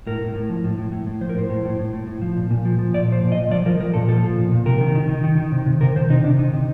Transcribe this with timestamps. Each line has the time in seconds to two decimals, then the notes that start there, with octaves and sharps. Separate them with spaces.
0.07 A2 A#4
0.21 A2
0.35 A2
0.49 F3
0.64 A2
0.78 A2
0.92 A2
1.07 A2
1.21 F3 C5
1.29 A#4
1.35 A2 C5
1.49 A2
1.65 A2
1.79 A2
1.93 A2
2.07 A2
2.22 F3
2.36 A#2
2.50 A#2
2.65 F3
2.79 F3
2.94 A#2 D5
3.08 F3 C5
3.23 A#2
3.32 D#5
3.37 A#2
3.51 F3 D5
3.66 F3 A#4
3.80 F3 A#4
3.94 A#2 A4
4.08 F3 A4
4.23 F3
4.38 A#2
4.52 A#2
4.65 C3 A#4
4.81 D#3
4.95 D#3
5.09 D#3
5.24 D#3
5.38 D#3
5.52 C3
5.66 C3
5.81 C3 A#4
5.96 D#3 C5
6.09 C3 D#4
6.24 C3 D4
6.39 D#3 D#4
6.53 C3